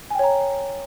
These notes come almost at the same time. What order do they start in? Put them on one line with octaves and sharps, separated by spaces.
G#5 G5 C#5 A#5